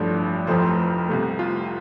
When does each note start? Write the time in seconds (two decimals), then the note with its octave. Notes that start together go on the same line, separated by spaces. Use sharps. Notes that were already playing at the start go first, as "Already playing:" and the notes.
Already playing: A1 G2 F3 A3 D5
0.47 F1 F2 F3 A3 C5
1.08 C2 C3 A3
1.39 F4